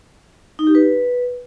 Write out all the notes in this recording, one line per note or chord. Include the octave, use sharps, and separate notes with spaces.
D#4
G4
B4